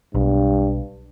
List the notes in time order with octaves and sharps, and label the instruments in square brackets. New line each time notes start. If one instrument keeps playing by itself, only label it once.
[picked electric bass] B1 [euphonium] G2